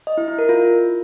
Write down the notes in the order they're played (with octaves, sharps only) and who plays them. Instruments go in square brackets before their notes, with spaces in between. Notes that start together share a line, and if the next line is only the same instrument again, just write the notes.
[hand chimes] D#5
E4
E4
A#4
F4